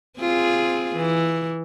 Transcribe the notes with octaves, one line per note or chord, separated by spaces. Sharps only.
C4 F4 G#4
E3